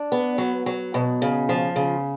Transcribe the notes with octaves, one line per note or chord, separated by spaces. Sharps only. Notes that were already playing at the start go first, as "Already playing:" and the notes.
Already playing: D4
B3
F#3
F#3
B2
C#3
F3
C#3